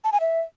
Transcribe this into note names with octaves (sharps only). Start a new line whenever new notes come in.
A5
G#5
E5